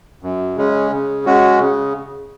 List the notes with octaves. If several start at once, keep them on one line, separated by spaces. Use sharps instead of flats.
F#2
C#3 G#3 C#4
C#3
G#3 C#4 F#4
C#3